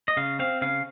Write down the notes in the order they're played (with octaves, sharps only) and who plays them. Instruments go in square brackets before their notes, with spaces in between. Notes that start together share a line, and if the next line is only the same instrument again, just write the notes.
[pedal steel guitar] D#5
C#3 F5
C4 F5
C#3 F5